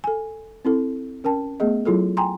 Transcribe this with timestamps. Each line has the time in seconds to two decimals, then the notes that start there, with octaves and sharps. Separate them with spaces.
0.04 A4 G#5
0.65 C4 E4 A4
1.24 C#4 A#4 G5 A5
1.60 A3 B3 G#4 D#5
1.85 F#3 E4 F4 G#4 A4
2.17 G5 G#5 A#5 C6